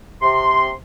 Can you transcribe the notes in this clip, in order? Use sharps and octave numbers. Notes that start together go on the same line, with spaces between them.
C3 C6